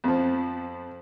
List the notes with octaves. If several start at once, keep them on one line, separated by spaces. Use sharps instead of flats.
F2 F3